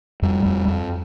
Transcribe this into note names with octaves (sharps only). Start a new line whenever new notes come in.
F2 G3
F2
F2